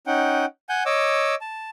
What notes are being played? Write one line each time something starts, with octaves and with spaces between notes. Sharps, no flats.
C#4 D#4 F#5 G5
F#5 G#5 G6
C#5 D#5 D6 E6
A5